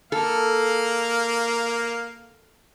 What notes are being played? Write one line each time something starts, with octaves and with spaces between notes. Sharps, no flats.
A#3 A4 F5